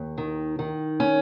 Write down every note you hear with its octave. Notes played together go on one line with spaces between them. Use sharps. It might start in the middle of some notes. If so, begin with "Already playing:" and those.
Already playing: D#2
D#3
D#3
C#4